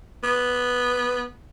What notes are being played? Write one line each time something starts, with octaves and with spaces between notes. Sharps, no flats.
B3